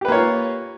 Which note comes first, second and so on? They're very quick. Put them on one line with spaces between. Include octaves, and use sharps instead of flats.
G4 B4 A#3 C#5 F4